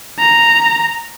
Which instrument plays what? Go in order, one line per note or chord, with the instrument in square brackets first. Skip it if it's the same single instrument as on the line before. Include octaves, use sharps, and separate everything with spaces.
[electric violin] A#5